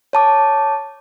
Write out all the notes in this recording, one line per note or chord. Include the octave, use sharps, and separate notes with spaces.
C#5 A5 D6